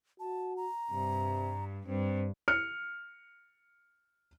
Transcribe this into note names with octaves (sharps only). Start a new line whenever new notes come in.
F#4 A5
A#5
G2 C3
G2 C4
F6 C#7